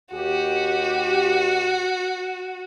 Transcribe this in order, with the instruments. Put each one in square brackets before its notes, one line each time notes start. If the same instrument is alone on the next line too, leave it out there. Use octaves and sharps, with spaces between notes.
[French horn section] D#2 G4 [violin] F#4